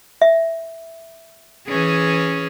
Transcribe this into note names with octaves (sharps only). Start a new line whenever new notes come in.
E5
E3 C#4 G#4